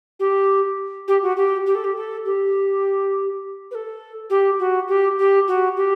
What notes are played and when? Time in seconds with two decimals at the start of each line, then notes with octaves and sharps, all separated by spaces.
0.19 G4
1.08 G4
1.23 F#4
1.37 G4
1.66 G4
1.75 A4
1.84 G4
1.96 A4
2.25 G4
3.71 B4
3.75 A4
4.30 G4
4.59 F#4
4.88 G4
5.19 G4
5.48 F#4
5.77 G4